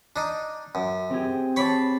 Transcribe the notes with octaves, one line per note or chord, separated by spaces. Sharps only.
D4 D#4
F#2
C4 G4 G#4
C#5 A5 B5 D6 C7